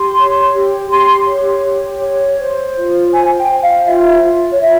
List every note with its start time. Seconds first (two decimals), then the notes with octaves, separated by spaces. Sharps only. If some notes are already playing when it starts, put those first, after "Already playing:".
Already playing: G4 C6
0.18 C#5
0.55 G4
0.91 G4 C6
1.27 C#5
1.65 G4
2.02 C#5
2.39 C5
2.75 F4
3.12 C5 G#5
3.37 G5
3.49 C5
3.62 F5
3.86 F4 E5
4.24 F4
4.51 C#5
4.60 F4 E5